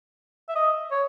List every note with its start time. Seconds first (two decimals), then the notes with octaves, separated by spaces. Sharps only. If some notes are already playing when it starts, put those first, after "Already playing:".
0.49 E5
0.55 D#5
0.91 C#5